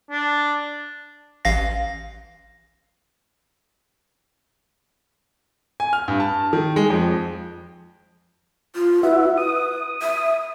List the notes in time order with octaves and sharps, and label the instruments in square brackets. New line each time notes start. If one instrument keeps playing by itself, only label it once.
[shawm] D4
[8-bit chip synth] A1 F5 A#6
[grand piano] G#5
F6
G2
A5
D#3
G#3
F2
[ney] F4
[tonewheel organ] E4 F#4 E5 [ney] B4
[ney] B4 [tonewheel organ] D#6
[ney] E5